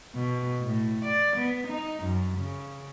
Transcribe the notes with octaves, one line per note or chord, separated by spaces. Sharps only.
B2
A2
D5
B3
D#4
F#2
C#3